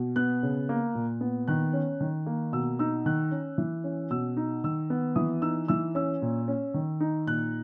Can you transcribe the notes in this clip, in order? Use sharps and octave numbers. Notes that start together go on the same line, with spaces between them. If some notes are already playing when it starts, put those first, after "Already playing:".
Already playing: B2
B3 F#6
C#3
A#3
A#2
B3
D#3 F#6
C#4
D#3
A#3
B2 E6
D#4 E6
D#3 F#6
C#4
E3
C#4
B2 E6
D#4
D#3 E6
B3
E3 D#6
D#4 E6
E3 E6
C#4 E6
A#2
C#4
D#3
D#4
A#2 F#6